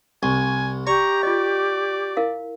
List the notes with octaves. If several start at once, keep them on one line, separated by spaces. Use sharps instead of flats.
C2 G#5 C#6
G4 D5 A#5 C#6
F4 D5 D#5
E4 A#4 F5